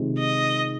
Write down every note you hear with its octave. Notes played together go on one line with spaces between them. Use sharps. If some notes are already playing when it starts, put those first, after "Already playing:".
Already playing: C3 D#3 G#3 C4 F4
D#5